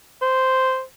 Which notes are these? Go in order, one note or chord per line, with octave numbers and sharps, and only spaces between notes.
C5